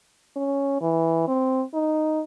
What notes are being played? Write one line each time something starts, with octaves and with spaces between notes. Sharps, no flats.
C#4
E3
C4
D#4